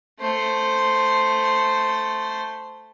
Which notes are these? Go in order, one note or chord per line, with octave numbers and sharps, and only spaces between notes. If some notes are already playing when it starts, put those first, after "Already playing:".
A3 C5